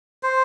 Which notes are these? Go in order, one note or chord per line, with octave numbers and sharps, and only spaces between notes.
C5